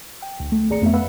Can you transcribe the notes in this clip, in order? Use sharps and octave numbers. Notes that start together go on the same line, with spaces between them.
G5
D2
A3
G#1 G#4 D5 A#5 C#7
F2 A3 B3 E5
B4 F5 F#5 B5 E6